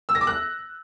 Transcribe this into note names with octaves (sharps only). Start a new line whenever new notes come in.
E6
A#6
D6
F#6